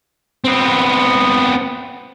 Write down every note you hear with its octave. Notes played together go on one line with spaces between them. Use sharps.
B3 C4